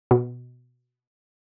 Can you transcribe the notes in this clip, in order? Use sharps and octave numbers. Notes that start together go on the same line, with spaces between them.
B2